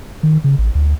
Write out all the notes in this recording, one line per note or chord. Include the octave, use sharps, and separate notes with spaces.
D#3
C#3
A1
D2